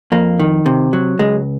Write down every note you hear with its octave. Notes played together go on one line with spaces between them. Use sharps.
F2 A#3
D#3
C3
F#3
C#2 G#3